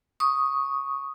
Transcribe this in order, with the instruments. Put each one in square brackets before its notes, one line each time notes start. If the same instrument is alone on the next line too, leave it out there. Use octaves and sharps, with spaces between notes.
[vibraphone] C#6 D#6